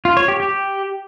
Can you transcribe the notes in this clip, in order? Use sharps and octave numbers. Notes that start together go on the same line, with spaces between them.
F4
C#5
G4
G4